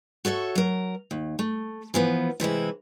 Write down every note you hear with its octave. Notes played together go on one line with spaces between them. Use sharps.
F#4 A4 C#5 E5
F#3 A#4
D#2
A3
E3 F3 B3
C3 E3 G#3 E4